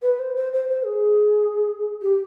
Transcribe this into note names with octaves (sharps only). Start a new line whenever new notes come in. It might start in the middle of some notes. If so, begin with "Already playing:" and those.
B4
C5
C5
C5
C5
G#4
G4